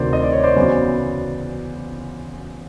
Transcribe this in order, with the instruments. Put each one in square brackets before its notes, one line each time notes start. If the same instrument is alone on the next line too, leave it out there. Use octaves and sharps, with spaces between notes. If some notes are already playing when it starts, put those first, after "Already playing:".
Already playing: [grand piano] D2 C3 D#3 C5 D5
D#5
D5
C#5
C5 D5
E2 C#3 F#3 B3